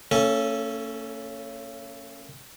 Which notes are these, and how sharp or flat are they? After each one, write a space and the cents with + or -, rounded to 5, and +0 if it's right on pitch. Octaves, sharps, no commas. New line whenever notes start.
A#3 -45 C#4 +0 A4 +0